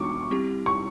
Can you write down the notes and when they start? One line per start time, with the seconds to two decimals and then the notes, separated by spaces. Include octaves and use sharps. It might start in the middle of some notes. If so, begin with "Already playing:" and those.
Already playing: E3 G#3 B3 D4 F#4 C#6 D6
0.31 G3 C4 E4 G4
0.66 C#6